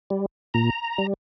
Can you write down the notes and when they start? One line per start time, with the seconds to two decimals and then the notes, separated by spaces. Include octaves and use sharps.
0.10 G3
0.54 A#2 A#5
0.98 G3